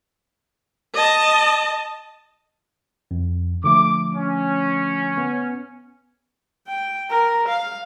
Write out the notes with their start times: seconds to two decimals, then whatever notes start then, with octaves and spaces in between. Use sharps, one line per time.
0.94 D#5 A5
3.11 F2
3.64 D3 F3 A3 D6
4.14 C#4
5.18 B3
6.68 G5
7.10 A#4
7.48 F5